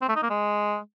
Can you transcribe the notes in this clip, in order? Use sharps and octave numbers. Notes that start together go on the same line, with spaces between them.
C4
A3
D#4
A#3
G#3